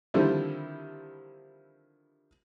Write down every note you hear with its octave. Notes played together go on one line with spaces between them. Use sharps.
D3 D#3 F3 G3 C4 E4